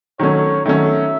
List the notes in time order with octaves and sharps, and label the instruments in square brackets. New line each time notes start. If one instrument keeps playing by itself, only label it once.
[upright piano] D#3 F#3 A3 C#4 [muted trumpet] C#5
[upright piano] D#3 F#3 A3 C#4 [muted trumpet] E5